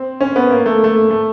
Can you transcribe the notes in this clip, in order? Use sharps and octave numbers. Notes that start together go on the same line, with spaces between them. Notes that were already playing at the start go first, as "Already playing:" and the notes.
Already playing: C4
C#4
B3
A#3
A3
A3
A3